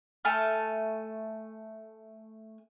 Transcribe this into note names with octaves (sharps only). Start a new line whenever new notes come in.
A3 G#5 A5 F6